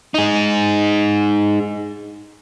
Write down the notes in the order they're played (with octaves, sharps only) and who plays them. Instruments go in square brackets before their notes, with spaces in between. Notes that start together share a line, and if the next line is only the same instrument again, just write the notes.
[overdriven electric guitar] D#4 G#4